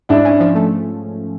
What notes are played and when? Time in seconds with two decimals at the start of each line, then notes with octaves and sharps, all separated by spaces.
0.09 G#2 D4 E4
0.25 C#4
0.40 F3
0.55 A3